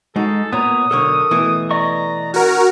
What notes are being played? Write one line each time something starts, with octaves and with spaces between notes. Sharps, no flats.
G#3 D#4 F#4 A4
A#2 B3 C#5 A#5 D#6
B1 D3 A4 A#4 C#5
B2 E3 A3
D5 D#5 A#5 C#6
C#4 F#4 A#4